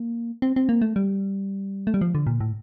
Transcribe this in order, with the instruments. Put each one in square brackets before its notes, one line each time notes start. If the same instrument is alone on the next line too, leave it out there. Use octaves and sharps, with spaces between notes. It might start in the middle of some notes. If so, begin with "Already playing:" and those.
Already playing: [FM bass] A#3
C4
C4
A#3
A3
G3
A3
G3
F3
D3
A#2
A2